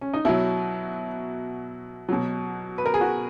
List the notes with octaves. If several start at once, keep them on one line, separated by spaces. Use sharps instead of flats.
C#4
D#4
B2 F#3 E4
B2 F#3
B4
A#4
G#4
F#4